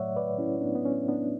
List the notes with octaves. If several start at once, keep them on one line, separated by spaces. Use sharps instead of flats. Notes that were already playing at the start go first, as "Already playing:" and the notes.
Already playing: A2 F#3 A3 C#5 D5 E5 F#5
B4 D5
C#4 E4
B3 D4
B3
C#4
B3 D4